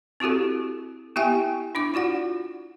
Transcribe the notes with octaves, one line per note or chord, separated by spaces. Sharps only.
C4 E4 F#4 G4 A4
B3 E4 G4 E5 G5 G#5
D4 E4 D6
F4 F#4 D5 F#5